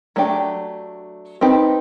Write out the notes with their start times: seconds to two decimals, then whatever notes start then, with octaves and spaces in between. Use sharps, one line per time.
0.16 F#3 A3 D4 G4
1.41 C4 D#4 G4 B4